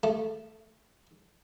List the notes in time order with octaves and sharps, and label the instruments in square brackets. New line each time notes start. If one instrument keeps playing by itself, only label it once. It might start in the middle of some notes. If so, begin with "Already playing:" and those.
[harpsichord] A3